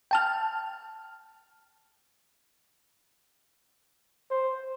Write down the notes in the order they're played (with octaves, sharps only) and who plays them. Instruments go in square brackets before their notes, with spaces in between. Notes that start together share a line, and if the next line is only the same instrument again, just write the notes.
[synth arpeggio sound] G5 A5 F6
[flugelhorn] C5